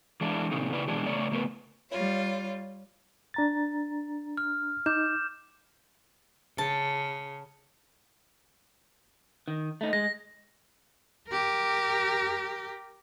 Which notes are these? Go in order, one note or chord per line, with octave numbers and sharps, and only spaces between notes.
E3 G#3 D4 E4
A#2 C#3 C4 D#4
C#3 E4 B4 D5
B2 E3 G#3 D4 G4
C#3 A3 C#5 D5
C#3 A3 B3 A#4 B4
G3 F4 C#5
D4 A#5 A6
F6
D#4 D6 G6 E7
C#3 A5
D#3
A3 D#4
G#3 A#6
G4 A#4